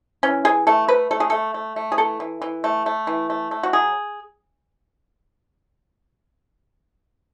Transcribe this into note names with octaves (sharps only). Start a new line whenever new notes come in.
E3 C#4
E3 G#4
A3 A4
A3 B4
A3 A4
G#4
A3 A4
A3
A3
G#4
E3 A4
E3
E3
A3
A3
E3
A3
A3
F#4
F#3 G#4